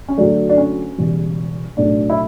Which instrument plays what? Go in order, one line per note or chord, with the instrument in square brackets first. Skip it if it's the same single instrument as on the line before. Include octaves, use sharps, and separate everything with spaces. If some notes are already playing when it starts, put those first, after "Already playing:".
[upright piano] C#4
D2 D3 F#3 A3 D4
D4
C#4
E1 E2 C#3 G3
B1 A2 F#3 A3 D4
E4